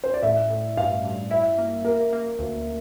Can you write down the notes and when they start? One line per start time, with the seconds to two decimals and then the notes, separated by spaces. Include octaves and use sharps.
0.04 C5
0.14 D5
0.22 A2 E5
0.50 A2
0.77 G2 F5
1.04 G2
1.31 E4 E5
1.58 A#3
1.85 A#3 A#4
2.13 A#3
2.39 D2